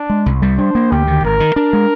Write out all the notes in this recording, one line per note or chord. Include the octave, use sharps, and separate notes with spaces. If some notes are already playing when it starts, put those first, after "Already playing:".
Already playing: D4
G#3
C2
G3
D4 C5
A#3
D2 G4
D#3
G#1 A#4
D#3
D4 A#4
G#3